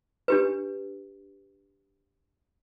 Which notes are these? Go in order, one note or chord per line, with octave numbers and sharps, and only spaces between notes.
D4 G4 B4